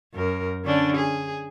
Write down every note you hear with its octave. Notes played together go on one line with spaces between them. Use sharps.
F#2 A#4
D3 C#4 D4
G#4